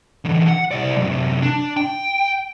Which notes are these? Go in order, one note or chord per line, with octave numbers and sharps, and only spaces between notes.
D3 E3
F#5
C2 D5
F#2 C3
D4
G5